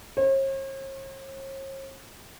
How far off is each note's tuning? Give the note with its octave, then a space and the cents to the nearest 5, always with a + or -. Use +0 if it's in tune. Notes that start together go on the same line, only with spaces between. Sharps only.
C#5 -45